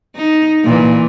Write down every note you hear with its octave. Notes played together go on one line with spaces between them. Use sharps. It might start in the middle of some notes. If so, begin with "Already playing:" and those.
D#4
A#2 E3